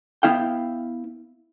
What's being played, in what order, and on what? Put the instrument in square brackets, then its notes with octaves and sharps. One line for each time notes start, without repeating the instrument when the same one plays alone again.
[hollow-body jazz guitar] B3 E4 F5 G5